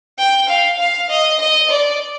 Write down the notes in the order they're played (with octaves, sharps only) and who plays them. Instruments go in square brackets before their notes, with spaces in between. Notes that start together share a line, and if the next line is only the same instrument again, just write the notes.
[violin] G5
F5
F5
D#5
D#5
D5